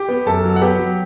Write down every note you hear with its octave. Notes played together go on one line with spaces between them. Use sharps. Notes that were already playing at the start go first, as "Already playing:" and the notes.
Already playing: G4 G5
B3
F#2 A4 A5
F#3
F#5
B3 G4 G5
F#3